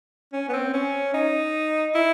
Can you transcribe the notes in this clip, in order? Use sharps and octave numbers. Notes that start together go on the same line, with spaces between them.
C#4
B3
C4
C#4
D#4
E4